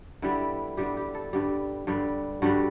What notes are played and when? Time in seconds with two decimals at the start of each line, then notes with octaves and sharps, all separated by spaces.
0.22 D3 G3 B3 E4
0.77 D3 G3 B3 G4
0.97 G4
1.15 A4
1.33 G2 D3 G3 G4
1.87 G2 D3 G3
2.42 G2 D3 G3 F#4